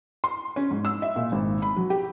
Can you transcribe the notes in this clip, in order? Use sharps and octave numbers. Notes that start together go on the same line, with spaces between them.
C6
C#4
G#2
E6
E5
A#2
G#1
B5
F#3
G4